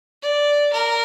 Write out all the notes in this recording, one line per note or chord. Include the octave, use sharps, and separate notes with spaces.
D5
A#4